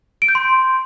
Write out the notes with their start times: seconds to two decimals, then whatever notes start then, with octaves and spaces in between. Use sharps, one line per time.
0.22 D7
0.28 G6
0.35 C6